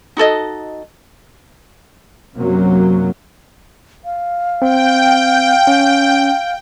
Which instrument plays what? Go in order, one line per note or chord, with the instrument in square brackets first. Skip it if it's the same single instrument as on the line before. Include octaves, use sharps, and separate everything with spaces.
[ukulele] D#4 F#4 A4 D#5
[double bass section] F#2 C3 F#3 A#3
[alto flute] F5
[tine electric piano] C4 [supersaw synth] G5
[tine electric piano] C#4